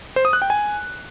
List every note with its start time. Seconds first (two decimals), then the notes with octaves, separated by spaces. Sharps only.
0.16 C5
0.25 D#6
0.33 F#6
0.42 G5
0.50 G#5